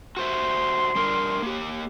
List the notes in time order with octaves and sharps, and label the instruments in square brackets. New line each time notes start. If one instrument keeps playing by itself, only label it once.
[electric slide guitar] F#4 C5 E5 [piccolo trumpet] C6
[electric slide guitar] G3 D4 A#4
A#3 G4